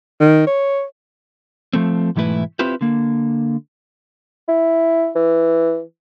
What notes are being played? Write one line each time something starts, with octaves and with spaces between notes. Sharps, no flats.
D#3
C#5
F3 A3 C4
B1 G#2 E3 A3 E4 B4
C4 E4 F4 G4 B4 C5
D3 A#3
E4
E3